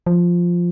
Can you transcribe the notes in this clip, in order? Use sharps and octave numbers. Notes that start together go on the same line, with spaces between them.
F3